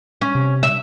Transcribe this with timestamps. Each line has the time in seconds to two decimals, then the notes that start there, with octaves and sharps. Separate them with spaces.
0.21 C#4
0.35 C3
0.63 E5